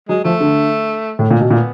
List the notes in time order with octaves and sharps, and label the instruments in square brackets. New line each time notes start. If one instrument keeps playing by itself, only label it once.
[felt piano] F#3 [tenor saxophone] G#3
[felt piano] F3 [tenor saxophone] A3
[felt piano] D3
A2
A#2
B2
[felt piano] A#2 [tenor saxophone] B3